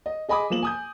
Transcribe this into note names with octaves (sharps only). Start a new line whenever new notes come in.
D#5
G#4 D#5 G#5 B5 D6 D#6
F3 A#3 E7 F#7
G#5 D#6 G6